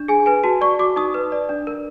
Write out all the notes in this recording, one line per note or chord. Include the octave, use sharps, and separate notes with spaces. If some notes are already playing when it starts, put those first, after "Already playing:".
Already playing: D4
G#4 G#5
B4 G#5
F#4 A5
D5 C#6
F#4 D6
D#4 D#6
B4
D5
D4
A#4